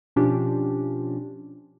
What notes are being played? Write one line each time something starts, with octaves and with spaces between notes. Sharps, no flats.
B2 F3 C#4 D4 F4 G4